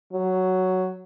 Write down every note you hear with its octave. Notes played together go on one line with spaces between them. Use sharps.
F#3